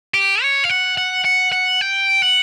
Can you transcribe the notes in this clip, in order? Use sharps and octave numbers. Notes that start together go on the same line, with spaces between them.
G4
C#5
F5
F#5
F#5
F#5
F#5
G5
F#5